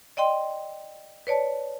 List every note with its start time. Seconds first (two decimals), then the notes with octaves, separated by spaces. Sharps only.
0.17 D5 D#5 G5 C6
1.27 B4 C#5 D5 A5